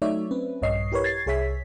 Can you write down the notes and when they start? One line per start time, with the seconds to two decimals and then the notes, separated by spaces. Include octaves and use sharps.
0.02 F#3 A3 D#4 C#5 D5 E5
0.31 C4 C#4 B4
0.62 A#1 G2 C#5 D#5 C7
0.92 E4 G4 A#4 B4 C#5
1.04 G#6 A6 C7
1.26 C2 G#4 C#5 E5 B6